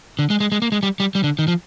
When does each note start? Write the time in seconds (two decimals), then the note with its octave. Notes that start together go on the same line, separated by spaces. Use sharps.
0.19 D3
0.30 G#3
0.40 G#3
0.52 G#3
0.62 A#3
0.72 G#3
0.83 G3
1.00 G3
1.15 G3
1.24 D3
1.39 D#3
1.48 F3